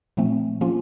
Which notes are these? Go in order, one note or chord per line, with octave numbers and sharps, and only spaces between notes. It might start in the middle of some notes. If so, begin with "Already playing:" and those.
A#2 F3 A3 C4
F3 A#3 C#4 F4